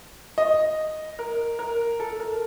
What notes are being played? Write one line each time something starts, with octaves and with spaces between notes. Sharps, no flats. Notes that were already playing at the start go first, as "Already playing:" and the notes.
D#5
A#4
A#4
A4
A#4